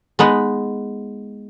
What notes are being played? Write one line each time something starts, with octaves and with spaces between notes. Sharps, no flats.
G#3 B3 D#4 B4